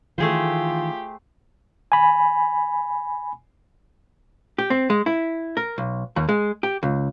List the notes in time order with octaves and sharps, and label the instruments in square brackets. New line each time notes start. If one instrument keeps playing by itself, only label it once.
[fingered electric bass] D#3 E3 [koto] A3 G#4 C5 [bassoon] F4 [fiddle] G4
[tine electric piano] G#5 B5
[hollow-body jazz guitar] G4
C4
G#3
E4
A#4
B1
D#2
G#3
G4
C#2